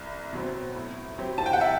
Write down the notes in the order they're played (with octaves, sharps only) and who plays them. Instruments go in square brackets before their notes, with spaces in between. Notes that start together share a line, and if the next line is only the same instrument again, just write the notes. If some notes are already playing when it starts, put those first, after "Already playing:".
Already playing: [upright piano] C2
B2 F#3 C4
A2
F#3 C4 G4
[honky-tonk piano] A5
G5
F#5
E5